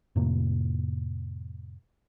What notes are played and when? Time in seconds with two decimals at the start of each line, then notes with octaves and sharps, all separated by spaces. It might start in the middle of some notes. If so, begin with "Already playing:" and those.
0.16 F2 A2 C3 A#3